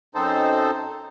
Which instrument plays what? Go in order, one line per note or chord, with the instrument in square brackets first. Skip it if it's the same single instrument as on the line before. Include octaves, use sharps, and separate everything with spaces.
[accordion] F#2 C4 D#4 A4 C5